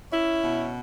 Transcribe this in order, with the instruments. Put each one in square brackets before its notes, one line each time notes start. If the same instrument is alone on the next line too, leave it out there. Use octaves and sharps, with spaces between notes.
[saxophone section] C#4 E4
B2